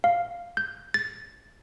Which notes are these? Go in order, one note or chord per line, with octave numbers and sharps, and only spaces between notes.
F5
G6
A6